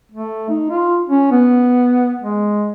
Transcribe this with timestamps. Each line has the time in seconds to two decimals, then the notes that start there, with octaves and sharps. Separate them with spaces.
0.12 A3
0.49 D#4
0.70 F4
1.09 C#4
1.32 B3
2.22 G#3